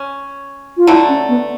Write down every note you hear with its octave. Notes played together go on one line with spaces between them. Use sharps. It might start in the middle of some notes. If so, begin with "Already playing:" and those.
Already playing: C#4
F4
D3 F#3 A3 E4
C#4
B3